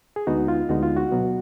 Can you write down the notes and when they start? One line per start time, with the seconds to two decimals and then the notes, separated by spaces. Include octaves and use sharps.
0.16 G#4
0.27 D2 D3 G#3 B3 D#4 F#4
0.48 F4
0.69 D2 D3 G#3 B3 D#4 F#4
0.83 F4
0.96 F#4
1.11 B2 F#3 B3